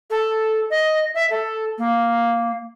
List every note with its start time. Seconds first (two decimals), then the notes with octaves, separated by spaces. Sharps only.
0.10 A4
0.70 D#5
1.14 E5
1.30 A4
1.78 A#3